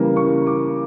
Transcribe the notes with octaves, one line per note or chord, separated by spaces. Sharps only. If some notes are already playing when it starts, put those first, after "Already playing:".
Already playing: C#3 E3 G3 A#3
C#6
D6